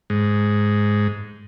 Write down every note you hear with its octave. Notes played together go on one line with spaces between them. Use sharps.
G#2